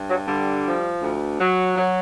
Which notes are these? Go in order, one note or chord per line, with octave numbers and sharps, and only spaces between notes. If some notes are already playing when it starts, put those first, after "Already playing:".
Already playing: G2
F#3
D3 G3
F3
D2
F#3
F#3